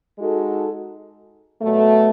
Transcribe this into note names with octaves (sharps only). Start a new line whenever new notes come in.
G#3 D#4 F#4 A4
B2 F#3 A3